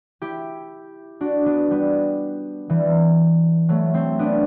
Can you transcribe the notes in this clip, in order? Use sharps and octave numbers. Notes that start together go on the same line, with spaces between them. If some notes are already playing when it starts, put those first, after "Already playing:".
E4 G4
D4 F#4
B3 D4
G3 B3
E3 G3
F#3 A3
A3 C4
B3 D4